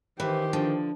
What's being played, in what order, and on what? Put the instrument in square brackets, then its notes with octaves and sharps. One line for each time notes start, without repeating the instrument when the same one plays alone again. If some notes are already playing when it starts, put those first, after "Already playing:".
[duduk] D#3 [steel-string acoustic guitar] E3 [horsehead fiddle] G4 C5 [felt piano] B4
[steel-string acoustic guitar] D3 [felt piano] F3